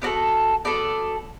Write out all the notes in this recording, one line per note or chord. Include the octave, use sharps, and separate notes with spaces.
B3 F#4 A4 D5
B3 F#4 A4 D5